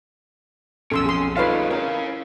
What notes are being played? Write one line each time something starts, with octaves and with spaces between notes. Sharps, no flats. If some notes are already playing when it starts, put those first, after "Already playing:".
B1 F2 C#4 A4 C6 E6
G#4 C6
G3 D#4 F4 A4 B4 C#5 F5
C#4 E4 G#4 A#4 C#5 F5